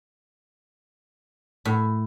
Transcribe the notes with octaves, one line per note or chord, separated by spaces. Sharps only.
A2